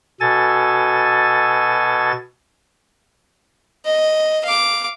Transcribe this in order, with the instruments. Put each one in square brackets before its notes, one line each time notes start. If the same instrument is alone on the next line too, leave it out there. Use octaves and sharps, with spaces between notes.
[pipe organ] B2 A4 G#5 A6
[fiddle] D#5
F5 D6